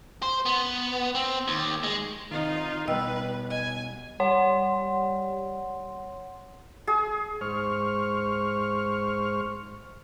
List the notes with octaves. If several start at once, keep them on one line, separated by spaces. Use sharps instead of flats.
C5
B3
C4
D#2
G#3
C3 D#3 D#4 F4
B2 G3 B4 D#5 G5 E6
D#5 G#5
G3 C#5 F#5 C6
G#4
G#2 C5 C#6 F6